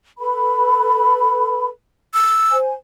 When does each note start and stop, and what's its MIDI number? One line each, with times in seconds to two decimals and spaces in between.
0.19 1.68 69
0.19 1.68 71
0.19 1.68 83
2.14 2.57 88
2.52 2.73 72
2.52 2.73 80